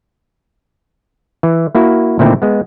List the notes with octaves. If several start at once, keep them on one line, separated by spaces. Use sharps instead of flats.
E3
A#3 E4 F#4
A#2 D3 D#3 A3 C4 E4
G#3 B3